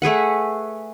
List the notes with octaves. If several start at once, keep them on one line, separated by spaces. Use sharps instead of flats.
A3 G#4 B4 F#5